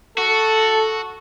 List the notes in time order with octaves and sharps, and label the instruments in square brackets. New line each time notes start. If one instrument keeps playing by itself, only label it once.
[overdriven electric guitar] F#4 [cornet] A4